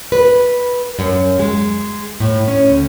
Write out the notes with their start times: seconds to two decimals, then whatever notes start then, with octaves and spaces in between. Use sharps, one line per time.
0.12 B4
0.99 F#2
1.39 G#3
2.20 A2
2.48 C#4
2.69 D2